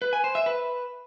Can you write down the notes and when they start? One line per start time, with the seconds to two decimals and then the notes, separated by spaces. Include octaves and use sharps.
0.02 B4
0.13 G#5
0.24 C5
0.35 E5
0.46 B4